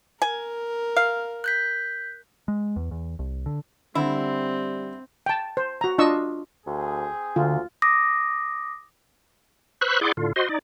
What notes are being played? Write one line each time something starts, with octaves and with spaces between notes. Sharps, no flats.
A#4 G#5
F5
F#6 G6 B6
G#3
E2
E2
C2
D3
D3 G3 C4 E4
G5 A5
C5
F#4 A#5
D4 F4 D#5 C#6 E6
D2 C4 G#4
D2 D3 F4
D6 D#6 A#6
B4 C5 B5 C#6 E6 F#6
E4 G#4 D5 F#5 C6 D6
A2 D3 F4
F#4 C5 D#5 C6
D#4 D5